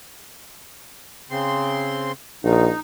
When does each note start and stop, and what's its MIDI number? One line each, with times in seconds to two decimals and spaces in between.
1.30 2.12 49
1.30 2.12 60
1.30 2.12 84
2.44 2.69 34
2.44 2.80 63